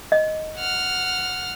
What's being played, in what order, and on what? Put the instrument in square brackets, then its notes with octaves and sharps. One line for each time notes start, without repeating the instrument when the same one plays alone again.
[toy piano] D#5
[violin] F#5 F6